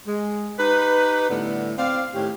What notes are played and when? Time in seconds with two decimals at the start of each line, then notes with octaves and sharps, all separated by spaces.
0.08 G#3
0.58 D#4 G4 B4
1.30 A2 D3 G3 B3 D4
1.78 C4 D5 F5
2.15 A2 D#3 C#4 G4